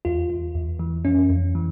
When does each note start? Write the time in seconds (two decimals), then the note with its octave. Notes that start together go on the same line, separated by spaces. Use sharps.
0.05 E2 F4
0.30 E2
0.55 E2
0.79 E3
1.05 F2 C#4
1.30 F2
1.55 E3